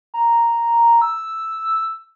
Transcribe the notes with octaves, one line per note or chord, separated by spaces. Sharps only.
A#5
E6